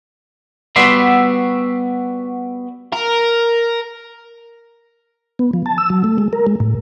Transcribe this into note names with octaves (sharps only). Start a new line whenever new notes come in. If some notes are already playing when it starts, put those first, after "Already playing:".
G3 B3 F#4 D5 E5 C6
A#4
B3
F3
A5
E6
F#3
A3
G#3
A#4
G#3
A2